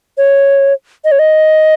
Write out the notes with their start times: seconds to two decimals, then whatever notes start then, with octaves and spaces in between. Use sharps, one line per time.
0.18 C#5
1.05 D#5
1.12 C#5
1.19 D#5